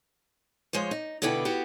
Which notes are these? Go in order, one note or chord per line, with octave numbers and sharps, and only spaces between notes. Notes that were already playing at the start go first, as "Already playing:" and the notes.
F3 G#3 C5 C#5
D#4
B2 D3 B3 E4 B4 G5
B3 F#4 G4